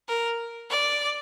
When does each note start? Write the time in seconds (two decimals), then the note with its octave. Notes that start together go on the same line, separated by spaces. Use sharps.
0.08 A#4
0.70 D5